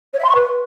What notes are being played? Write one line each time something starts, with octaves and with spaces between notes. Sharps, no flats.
C#5
E5
C6
C#6
B4